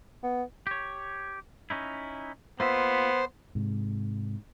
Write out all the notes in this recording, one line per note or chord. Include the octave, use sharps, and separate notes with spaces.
B3
G4 C#5
C#4 D#4 E4
A#3 B3 F4 C5 E5
G#2 C3